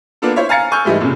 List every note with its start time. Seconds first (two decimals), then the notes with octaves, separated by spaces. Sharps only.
0.22 A#3 B3 D4 F4 A4
0.36 E4 C5 C#5 E5
0.49 F5 G#5 A#5 A6 C#7
0.72 G#5 C#6 E6 F6 G6
0.85 G#2 E3 G3 A3 D#4
1.00 F1 A#2 C#3